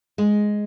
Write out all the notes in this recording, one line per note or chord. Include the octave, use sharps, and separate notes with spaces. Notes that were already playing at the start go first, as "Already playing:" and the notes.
G#3